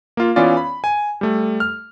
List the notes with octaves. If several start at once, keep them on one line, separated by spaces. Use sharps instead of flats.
A#3 F4
E3 B3 C#4 F4 D5
B5
G#5
G3 A3
F6